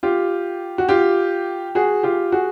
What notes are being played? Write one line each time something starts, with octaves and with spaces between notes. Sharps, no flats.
F4 G4
F#4
F4 G4
F#4 G#4
F4 G4
F#4 G#4